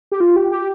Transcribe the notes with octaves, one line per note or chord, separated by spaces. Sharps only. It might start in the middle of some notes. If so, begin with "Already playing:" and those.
G4
F4
G4
G4